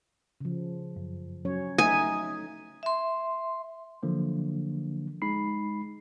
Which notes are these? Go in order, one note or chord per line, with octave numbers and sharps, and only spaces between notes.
C#3 F3
F#2
F#3 C#4 C#5
A3 D#4 E5 G#5 D#6
E5 C6
D3 F3 F#3 A#3 D4
G#3 D#4 B5 C7